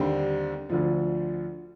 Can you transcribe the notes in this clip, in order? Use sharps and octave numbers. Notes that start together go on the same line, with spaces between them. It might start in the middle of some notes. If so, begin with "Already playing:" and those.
Already playing: D#2 D3 G3 C4
D2 D3 F3